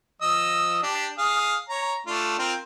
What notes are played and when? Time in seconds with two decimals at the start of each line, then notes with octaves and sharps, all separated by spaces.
0.22 F3 D#5 E6
0.83 D4 G4
1.18 G#4 F5 D#6
1.69 C#5 A#5
2.07 A3 D4 F4
2.39 C4 F4 A#4